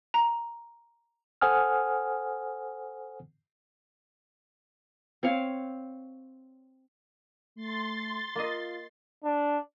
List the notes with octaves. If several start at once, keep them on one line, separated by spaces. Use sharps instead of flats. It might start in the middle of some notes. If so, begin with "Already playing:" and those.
A#5
A4 C5 F#5 G#5 D#6 F6
C4 C#5 F5
A3 C6 A6
A#3 F4 D#5
D4